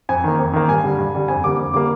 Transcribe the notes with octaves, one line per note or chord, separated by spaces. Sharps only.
F2 G#5
D#3 A#3
F2
D#3 A#3
G2 G#5
D3 G3
G2
D3 G3
F2 G#5
D3 G3 A#3 D6
F2 D6
D3 G3 A#3 D6